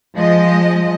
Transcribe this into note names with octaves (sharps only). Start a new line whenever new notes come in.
F3 G#3 D#5